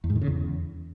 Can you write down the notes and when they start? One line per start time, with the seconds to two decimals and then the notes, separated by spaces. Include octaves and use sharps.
0.04 E2
0.10 G#2
0.16 D#3
0.21 C#3
0.27 E2